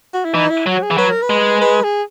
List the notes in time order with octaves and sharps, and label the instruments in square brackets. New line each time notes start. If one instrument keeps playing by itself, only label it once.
[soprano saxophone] F#4
E4
[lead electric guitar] E3 [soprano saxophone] D#4
[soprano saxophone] E4
[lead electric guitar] F#3 [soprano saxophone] F#4
[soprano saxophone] G#4
[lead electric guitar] E3
[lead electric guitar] F#3 [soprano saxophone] B4
[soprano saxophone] A#4
B4
[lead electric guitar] G#3
[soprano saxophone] B4
G#4